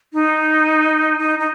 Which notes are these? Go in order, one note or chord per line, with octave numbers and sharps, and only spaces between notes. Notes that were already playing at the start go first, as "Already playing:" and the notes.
D#4
D#4
D#4